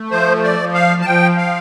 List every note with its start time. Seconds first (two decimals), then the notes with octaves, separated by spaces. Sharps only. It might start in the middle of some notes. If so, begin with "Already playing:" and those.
Already playing: A3
0.11 F3 C5
0.43 D5
0.59 F3
0.74 F5
1.01 A5
1.05 F3 G5
1.37 F5